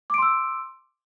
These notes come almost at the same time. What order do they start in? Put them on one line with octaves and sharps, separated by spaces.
D6 D7 C6 E6